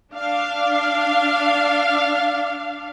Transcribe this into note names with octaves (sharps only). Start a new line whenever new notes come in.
D4 F5